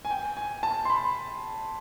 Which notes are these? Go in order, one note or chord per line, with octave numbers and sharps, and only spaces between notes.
G#5
G5
G#5
A5
C6
B5